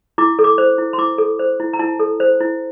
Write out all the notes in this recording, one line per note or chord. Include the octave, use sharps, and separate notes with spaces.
E4 D6
A4
D6
C5
E4
C6
E4 D6
A4
C5
E4
A#5
E4 A5
A4
C5
E4